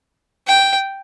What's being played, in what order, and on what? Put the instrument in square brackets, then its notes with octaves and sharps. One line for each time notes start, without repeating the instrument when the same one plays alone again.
[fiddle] G5